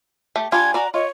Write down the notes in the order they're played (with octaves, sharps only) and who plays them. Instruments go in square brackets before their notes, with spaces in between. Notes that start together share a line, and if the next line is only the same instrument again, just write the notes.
[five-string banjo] A3 G4
[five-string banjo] G3 D4 F4 [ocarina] G#5 [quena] G#6
[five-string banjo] F#4 D5 [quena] A#5
[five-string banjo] F4 [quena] C#5 [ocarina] D#5